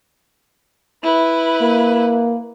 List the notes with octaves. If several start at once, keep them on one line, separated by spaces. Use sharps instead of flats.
E4 B4
A#3